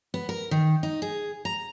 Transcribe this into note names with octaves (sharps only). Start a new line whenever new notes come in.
B3
A#4
D#3
D#4
G#4
A#5